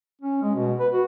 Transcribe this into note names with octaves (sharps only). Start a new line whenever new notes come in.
C#4
G#3
B2
B4
F#4